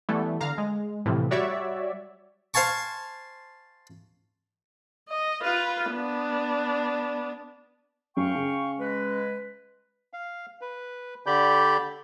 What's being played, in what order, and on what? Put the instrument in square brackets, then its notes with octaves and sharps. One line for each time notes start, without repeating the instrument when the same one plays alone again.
[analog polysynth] E3 G3 A3 B3
D3 F5 A#5
G#3
A2 C3 E3 F3
G3 F#4 C#5 D5 E5
[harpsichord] C5 F5 G#5 A5 C#6
[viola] D#5
F4 B4
B3 D4
[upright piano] F#2 C#4 [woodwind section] F5 G5 C#6
[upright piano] C#3
[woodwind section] G#3 B4
[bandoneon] F5
B4
D3 G4 D5 B5 G6